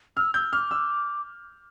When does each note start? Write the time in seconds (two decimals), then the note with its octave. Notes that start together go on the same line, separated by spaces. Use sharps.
0.17 E6 F6
0.34 E6 G6
0.53 D6 F6
0.71 E6